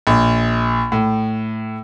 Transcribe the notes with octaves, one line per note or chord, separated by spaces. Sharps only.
A#1
A2